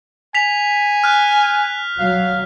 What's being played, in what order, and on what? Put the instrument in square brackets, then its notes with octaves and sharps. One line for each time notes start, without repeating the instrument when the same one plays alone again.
[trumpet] G#5 [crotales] B6 F7
[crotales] F6 F#6
[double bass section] F#3 [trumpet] F5